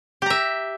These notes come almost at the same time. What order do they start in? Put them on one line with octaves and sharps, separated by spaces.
G4 A#5 E5